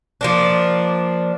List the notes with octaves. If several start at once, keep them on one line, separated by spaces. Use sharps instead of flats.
F3 A#3 D4